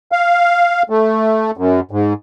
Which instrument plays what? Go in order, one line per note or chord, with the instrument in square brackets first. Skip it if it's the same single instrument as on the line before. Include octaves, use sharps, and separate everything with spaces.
[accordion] F5
A3
F#2
G#2